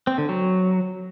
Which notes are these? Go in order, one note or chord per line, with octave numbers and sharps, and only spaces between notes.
C4
D3
F#3